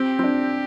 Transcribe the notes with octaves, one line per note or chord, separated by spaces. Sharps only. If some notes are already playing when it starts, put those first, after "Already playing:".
Already playing: C4 G4
C4
D4